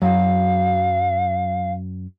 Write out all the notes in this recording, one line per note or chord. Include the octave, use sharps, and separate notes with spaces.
F#2 F#3 F5